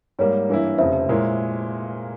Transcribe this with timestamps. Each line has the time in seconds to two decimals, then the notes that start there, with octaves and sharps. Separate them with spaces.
0.19 G#2 G3 A#3 C#5
0.49 G2 E3 A#3 E4
0.78 F1 F2 C#3 C5 E5
1.09 A#2 G#3 E4 A#4 C#5